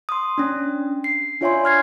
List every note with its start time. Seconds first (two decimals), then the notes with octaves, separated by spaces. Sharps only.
0.09 C6 D#6
0.38 C#4 D4
1.04 C7
1.41 D4 F4 C#5 E5 G#5 C6
1.64 C#5 F6 G#6 C7